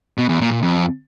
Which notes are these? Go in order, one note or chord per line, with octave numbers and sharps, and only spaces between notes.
B2
E2
A#2
A#2
F2